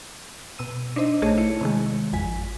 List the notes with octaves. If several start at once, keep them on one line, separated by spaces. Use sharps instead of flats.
B2 E6 D#7
D4 D#4 C5 D#5
A#1 A3 G#4 C#5 A5 D#7
E4 C#7
C3 D#3 G#3
G#1 F2 G#5 B6